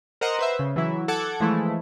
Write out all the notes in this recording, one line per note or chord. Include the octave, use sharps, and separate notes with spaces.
A#4 C5 D#5 F#5 A#5
B4 C5 E5
C#3
E3 F#3 E4
A4 F#5 D6 G#6
E3 F3 G#3 A3 E4